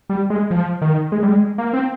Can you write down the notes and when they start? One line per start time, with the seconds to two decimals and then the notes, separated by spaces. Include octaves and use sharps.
0.10 G3
0.30 G#3
0.51 F3
0.82 D#3
1.12 G#3
1.23 G3
1.28 G#3
1.58 A#3
1.73 C4